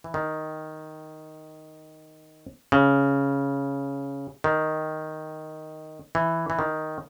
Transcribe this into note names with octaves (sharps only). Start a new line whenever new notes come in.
E3
D#3
C#3
D#3
E3
E3
D#3